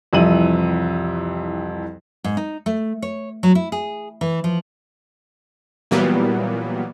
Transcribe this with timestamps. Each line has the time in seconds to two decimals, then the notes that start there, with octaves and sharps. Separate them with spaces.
0.13 C2 F2 E3 E4 D#7 F#7
2.24 G#2
2.37 D#4
2.66 A3
3.02 C#5
3.43 F#3
3.55 E4
3.72 G#4
4.21 E3
4.44 F3
5.91 A#2 E3 F#3 G3 A#3 B3